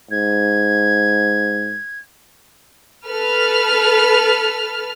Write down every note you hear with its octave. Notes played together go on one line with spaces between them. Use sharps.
G#2 G#6
A4 B4 F6